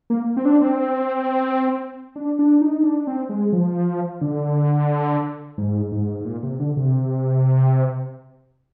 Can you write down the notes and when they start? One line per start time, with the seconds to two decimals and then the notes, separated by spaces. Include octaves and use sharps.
0.10 A#3
0.37 C4
0.45 D4
0.61 C4
2.16 D4
2.39 D4
2.61 D#4
2.83 D4
3.00 D4
3.07 C4
3.29 G#3
3.53 F3
4.21 D3
5.58 G#2
5.92 G#2
6.21 G#2
6.25 A#2
6.43 C3
6.60 D3
6.77 C3